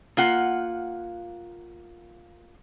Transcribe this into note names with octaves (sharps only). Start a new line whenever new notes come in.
A#3 F4 F#5